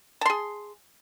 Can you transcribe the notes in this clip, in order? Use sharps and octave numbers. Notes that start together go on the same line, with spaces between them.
G#4 A5 C6